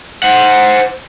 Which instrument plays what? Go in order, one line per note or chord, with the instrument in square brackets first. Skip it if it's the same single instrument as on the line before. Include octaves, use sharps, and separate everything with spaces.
[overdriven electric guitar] C5 F#5